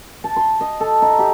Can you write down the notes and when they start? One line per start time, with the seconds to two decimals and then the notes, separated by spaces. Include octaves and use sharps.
0.24 A5
0.36 C6
0.61 D#5
0.80 A4
1.02 D#4
1.19 G4